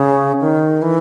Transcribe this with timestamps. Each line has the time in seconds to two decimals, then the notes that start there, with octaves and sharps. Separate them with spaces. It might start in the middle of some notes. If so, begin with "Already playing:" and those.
Already playing: C#3
0.41 D#3
0.82 E3